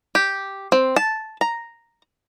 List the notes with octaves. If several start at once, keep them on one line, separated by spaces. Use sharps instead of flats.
G4
C4
A5
A#5